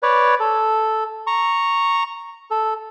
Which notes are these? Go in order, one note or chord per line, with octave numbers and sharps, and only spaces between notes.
B4 C#5 D5
A4
A#5 C#6
A4